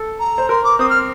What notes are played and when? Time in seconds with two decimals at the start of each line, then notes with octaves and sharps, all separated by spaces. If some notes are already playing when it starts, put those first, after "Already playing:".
Already playing: A4
0.20 A#5
0.38 C5
0.49 A#4 C6
0.64 D6
0.79 C4 D#6
0.90 F6